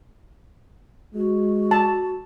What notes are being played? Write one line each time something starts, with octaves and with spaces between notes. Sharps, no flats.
G#3 F#4
A5